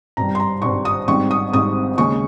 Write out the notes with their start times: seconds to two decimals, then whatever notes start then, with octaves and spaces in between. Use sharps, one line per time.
0.17 G#1 G2 G3 A#5
0.35 C6
0.40 A#5
0.62 G#1 G2 G3 C#6
0.85 D#6
1.07 G#1 G#2 G3 C4 C#6
1.31 D#6
1.53 G#1 G#2 G3 C4 D#6
1.98 D#2 C#3 G#3 C#4 C#6